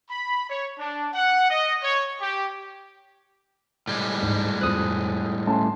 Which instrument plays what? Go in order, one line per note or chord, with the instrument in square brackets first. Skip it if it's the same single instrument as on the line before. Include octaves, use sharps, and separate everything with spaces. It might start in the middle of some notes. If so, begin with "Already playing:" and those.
[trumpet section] B5
C#5
D4
F#5
D#5
C#5
G4
[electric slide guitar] A2 G3 G#3
[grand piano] G#2
[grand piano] F2 C5 [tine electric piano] D#6 F#6
[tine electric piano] A3 C#4 [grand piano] A5 C6